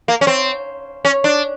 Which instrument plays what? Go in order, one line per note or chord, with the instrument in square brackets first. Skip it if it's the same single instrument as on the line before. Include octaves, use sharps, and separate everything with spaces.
[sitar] A#3
C#4
C4
C#4
D4